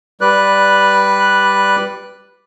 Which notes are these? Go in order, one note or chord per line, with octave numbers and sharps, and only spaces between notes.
G3 B4 D5 F#6